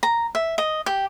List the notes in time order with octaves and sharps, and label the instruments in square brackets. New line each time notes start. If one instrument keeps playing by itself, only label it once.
[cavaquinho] A#5
E5
D#5
G4